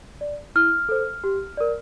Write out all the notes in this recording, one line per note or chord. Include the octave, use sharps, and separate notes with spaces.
D5
E4 F6
A4 C5
G4
A#4 D5